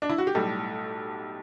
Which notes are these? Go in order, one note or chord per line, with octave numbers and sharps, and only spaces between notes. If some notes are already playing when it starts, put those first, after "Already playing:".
D4
E4
F#4
G4
B1 A2 G3 A4